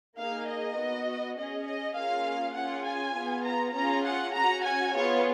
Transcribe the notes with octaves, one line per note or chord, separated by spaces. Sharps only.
A#3 D#4 G#4 F5
D#5
B3 F#4
C#4 G#4 D#5
D#5
A#3 C#4 F4 G#4 F5
C#4 F4 G#4 F#5
G#5
B3 F4 G#4
A#5
C#4 F4 G#4 A#5
F#5
C#4 F#4 A#5
G#5
B3 F4 G#4 C#5